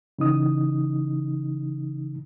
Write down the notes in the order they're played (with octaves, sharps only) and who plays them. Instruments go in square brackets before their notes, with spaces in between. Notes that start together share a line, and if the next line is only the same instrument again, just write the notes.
[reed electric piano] C#3 E3 D#4 D#6